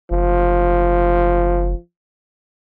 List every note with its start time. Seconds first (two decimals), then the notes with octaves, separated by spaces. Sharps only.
0.11 F#1 F3